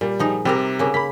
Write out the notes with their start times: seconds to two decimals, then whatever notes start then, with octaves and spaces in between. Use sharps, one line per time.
0.01 A#2 G3
0.19 F3 D#4 G#4
0.45 C3 G3 C4 A#4
0.79 C#3 A#3
0.94 A#3 B5 B6